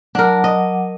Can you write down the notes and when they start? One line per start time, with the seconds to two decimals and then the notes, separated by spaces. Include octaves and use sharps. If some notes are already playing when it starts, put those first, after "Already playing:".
0.15 F#3 D4 A#4 F#5 D6
0.44 D#5